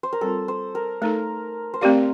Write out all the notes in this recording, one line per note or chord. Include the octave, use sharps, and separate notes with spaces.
C5
A#4
G3 C4 F4 A4
C5
A#4
A3 D#4 A4 A#4
C5
A3 C4 G4 A#4 D5 F5